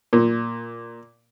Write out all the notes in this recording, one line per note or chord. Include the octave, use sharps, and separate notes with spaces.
A#2